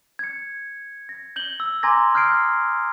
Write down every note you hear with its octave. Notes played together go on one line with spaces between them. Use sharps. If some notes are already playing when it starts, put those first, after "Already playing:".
G#6 C#7
A#6
G6 F#7 G7
E6
G#5 A#5 C6 D6 G#6 A#6
D#6 F6 G6 G#6 C7 D7